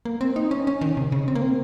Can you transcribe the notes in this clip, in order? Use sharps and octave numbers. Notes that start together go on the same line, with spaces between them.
A#3
C4
D#4
C#4
C#4
D#3
C3
C#3
C4
A#3
C4